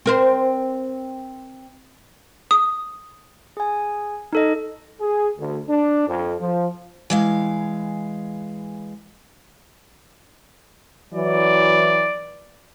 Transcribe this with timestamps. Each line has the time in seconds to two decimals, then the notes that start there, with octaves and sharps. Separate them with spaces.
0.06 C4 A#4 C5
2.51 D#6
3.57 G#4 G#5
4.33 D#4 A4 D#5
4.99 G#4
5.38 D2
5.68 D4
6.07 F2
6.40 F3
7.10 E3 G#3 F5
11.14 E3 F#3 D5